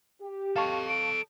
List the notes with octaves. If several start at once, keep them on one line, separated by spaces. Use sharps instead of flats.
G4
A4 D#5 F5 A5 C#6
D7